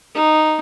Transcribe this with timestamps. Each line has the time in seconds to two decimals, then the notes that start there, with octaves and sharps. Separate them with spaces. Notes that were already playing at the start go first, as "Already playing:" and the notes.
0.15 D#4